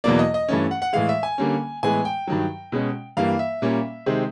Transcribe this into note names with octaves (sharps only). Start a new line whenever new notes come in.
E2 B2 F#3 A#3 D5
D#5
D#5
G2 E3 A3 C#4
F#5
F#5
A2 E3 G#3 F5
E5
G#5
D3 G3 A#3 C#4
A2 E3 G#3 B3 G#5
G5
G2 D#3 F#3
B2 G#3 C#4
G2 E3 G3 A#3 F5
E5
A#2 G3 A#3 C#4
C3 D#3 G#3 C4